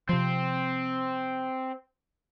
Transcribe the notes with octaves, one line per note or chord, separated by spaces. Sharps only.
C3 F3 C4